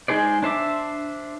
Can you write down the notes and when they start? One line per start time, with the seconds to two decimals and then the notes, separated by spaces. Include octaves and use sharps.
0.08 G#3 D#4 G#4 C5 D5
0.43 D4 C5 E5 D6